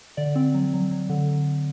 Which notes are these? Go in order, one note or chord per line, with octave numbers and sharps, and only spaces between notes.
D3 D5
C4
F#3
F#3
F#3
D3